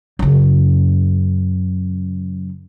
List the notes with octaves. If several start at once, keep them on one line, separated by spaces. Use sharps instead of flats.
F#2 C#3